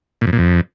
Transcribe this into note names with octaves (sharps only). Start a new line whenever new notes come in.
A#2
F2
A#2
F2